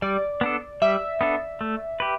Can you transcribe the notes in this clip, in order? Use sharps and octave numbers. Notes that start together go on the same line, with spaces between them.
G3 D5
B3 D4 A4
G3 E5
B3 D4 A4
A3
G4 B4